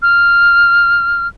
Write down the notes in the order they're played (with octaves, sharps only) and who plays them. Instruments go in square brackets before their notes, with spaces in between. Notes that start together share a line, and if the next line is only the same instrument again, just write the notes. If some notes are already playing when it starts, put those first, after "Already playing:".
[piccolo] F6